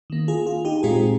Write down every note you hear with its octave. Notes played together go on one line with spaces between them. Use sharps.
D#3 A#3
F4 G#4
F4
D#4 G4
A#2 G#3 C4 F4 G#4